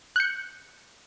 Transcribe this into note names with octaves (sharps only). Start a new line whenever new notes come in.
F#6 G6 C#7